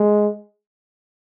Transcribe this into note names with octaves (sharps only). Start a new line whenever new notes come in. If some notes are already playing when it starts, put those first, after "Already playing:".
Already playing: G#3